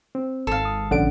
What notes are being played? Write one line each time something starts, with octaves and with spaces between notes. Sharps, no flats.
C4
G#1 A4 F5
D#6
A#1 D3 C#4 F#5 D7